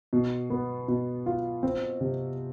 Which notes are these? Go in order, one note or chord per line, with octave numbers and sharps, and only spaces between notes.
B2
B3
B2
F4
C4
C3